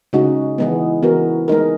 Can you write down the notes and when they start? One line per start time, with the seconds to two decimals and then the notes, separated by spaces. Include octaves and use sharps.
0.13 C#3 G#3 D#4 F#4
0.58 E3 G#3 B3
1.03 E3 B3 F#4 A#4
1.48 G#3 D#4 A#4